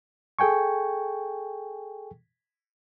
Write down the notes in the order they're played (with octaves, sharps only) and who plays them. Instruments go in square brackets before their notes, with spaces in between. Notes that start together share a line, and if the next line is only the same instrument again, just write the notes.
[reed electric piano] G#4 A4 G5 G#5 C#6